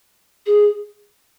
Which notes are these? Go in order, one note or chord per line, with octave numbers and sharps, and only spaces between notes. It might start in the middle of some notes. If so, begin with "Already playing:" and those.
G#4